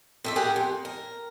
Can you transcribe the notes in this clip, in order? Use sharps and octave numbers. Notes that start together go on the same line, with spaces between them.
F2 A3 E5
G4 G#4 A#4 F#5 G#5
F2
A#4